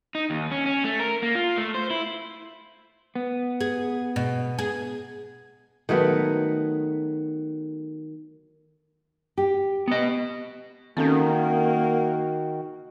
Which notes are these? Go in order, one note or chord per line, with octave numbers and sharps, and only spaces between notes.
D#4
D#2
C#4
C#4
A3
A#4
A#3
F4
A3
C5
E4
B3
G#4
B2
G#4
D#3 F#3 A3 B3
G4
B3 D#5
D#3 A#3 C4 C#4 F#4 A4